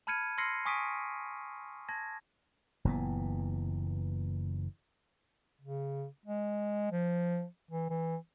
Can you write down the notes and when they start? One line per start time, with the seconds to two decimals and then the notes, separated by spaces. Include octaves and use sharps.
0.07 A5 B5 F6 G#6 C#7 D#7
0.38 C6 E6 F6 A#6 C7 C#7
0.65 G#5 C#6 D#6 B6 D7 D#7
1.89 A5 G#6 A#6
2.85 F#1 A#2 E3 B3
5.61 C#3
6.26 G#3
6.92 F3
7.71 E3
7.90 E3